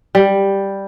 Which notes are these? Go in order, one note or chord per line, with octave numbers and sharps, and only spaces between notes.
G3